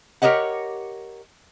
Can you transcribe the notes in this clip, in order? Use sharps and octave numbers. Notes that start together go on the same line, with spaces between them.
G4 A4 A#4 C#5 D#5 F#5